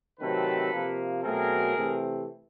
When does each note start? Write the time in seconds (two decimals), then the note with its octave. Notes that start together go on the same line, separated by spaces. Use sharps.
0.20 C3 D#3 F#3 A3 C4 A4 B4
0.72 C3 F3 A#3
1.23 B2 F#3 A3 C4 G#4 A#4
1.75 C3 E3 A3 C4